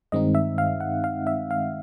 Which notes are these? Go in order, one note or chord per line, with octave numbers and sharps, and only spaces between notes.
G2 D#3 G#3 C4 D#4 D#5
E5
F5
F#5
F5
E5
F5